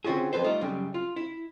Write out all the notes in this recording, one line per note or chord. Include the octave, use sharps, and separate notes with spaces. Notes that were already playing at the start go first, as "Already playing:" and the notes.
D3 C4 C#4 F4 F#4 G#4
F2 A#2 A4 B4 C5
G3 A3 D#4 F4
F#2 C#3 G3
F4
E4